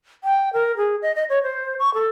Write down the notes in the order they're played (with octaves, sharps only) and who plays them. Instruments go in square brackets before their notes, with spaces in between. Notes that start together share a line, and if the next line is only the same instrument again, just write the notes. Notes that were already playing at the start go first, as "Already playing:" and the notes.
[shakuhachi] G5
A#4
G#4
D#5
D#5
C#5
C5
C#6
A4